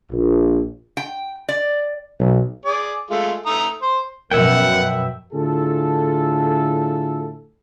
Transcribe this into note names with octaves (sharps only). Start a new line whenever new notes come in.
A#1
G5
D5
B1
G#4 D5
G#3 A3 F4
A3 A#5 D#6
C5
F#2 B2 F3 B3 A#4 E5 F#5 G5
A2 D3 E4 F4 G#4 A4